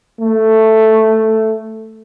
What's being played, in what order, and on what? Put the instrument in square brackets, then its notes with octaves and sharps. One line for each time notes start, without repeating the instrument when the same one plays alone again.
[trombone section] A3